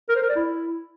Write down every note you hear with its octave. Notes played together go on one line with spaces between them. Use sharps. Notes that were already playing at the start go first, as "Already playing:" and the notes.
A#4
C5
A#4
D5
E4